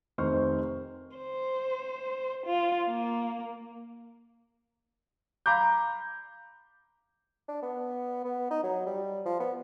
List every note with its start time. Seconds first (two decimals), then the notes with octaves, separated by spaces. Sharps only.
0.18 F1 D#3 C5 C#6 F6
1.18 C5
2.46 F4
2.88 A#3
5.46 F5 A#5 B5 D6 G6
7.48 D4
7.62 B3
8.25 B3
8.50 D#4
8.63 F#3
8.86 G3
9.25 F3
9.40 B3